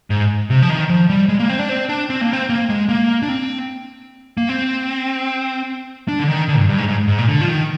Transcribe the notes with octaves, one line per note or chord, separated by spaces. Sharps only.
G#2
C3
F3
D#3
F3
G3
G#3
A#3
C4
D4
C4
D4
C4
A#3
C4
A#3
G#3
A#3
D4
C4
A#3
C4
D4
D3
D#3
D3
G2
G2
G#2
G#2
G#2
A#2
D3
F3
D#3